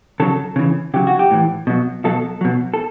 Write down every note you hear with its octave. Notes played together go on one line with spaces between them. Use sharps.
C#3 F#3 A4
C#3 E3
C#3 F#3 G4
F#4
G4
A2 E3
B2 F#3
B2 F#3 A4
B2 F#3
A4